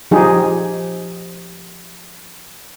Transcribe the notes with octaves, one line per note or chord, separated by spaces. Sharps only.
F3 D#4 G4 G#4